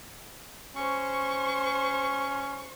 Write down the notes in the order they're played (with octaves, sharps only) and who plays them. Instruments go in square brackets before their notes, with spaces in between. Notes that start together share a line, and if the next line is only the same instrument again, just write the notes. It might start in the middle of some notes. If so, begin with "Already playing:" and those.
[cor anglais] C#4 [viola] C5 C#6